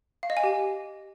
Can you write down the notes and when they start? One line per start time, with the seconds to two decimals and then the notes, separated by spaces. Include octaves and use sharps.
0.23 F5
0.30 D#5
0.37 G#5
0.44 G4